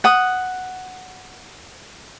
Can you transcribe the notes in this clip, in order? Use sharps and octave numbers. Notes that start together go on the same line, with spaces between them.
F#5 D#6